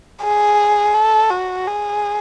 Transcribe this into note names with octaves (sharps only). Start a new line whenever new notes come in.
G#4
A4
F#4
G#4